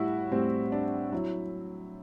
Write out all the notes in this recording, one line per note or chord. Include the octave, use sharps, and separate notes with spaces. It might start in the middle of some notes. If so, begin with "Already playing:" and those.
Already playing: A2 G3 E4 F#4
A2 G3 C4
D4
F#3 E4